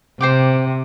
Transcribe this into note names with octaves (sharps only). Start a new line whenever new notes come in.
C3 C5 G5 D6